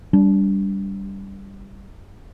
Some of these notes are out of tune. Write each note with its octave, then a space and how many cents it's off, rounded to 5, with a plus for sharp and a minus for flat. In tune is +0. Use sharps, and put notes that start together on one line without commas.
G3 +0 D4 -30